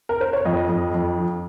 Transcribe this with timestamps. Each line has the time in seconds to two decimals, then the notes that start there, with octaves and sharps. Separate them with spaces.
0.09 A#4
0.21 C5
0.33 C#5
0.45 F2 D#5
0.69 F2
0.94 F2
1.18 F3